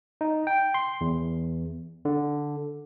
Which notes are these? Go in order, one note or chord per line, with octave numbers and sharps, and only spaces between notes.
D#4
G5
C6
E2
D3